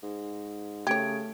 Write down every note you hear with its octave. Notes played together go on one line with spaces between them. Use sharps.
G#2
C#3 A3 G4 C#5 G#6 D7